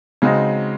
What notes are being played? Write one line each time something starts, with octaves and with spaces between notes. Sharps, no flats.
C#3 G#3 C4 D#4 F#4